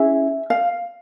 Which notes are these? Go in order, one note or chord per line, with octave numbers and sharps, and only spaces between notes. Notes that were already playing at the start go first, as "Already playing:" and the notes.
Already playing: C#4 E4 G#4 E5
F5